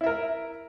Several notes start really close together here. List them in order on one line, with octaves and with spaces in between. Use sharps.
E4 E5 A#4